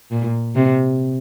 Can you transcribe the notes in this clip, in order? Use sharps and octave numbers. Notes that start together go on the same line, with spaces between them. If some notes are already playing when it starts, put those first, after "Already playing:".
A#2
C3